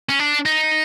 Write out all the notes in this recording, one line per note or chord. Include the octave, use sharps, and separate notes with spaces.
C#4
D4
D#4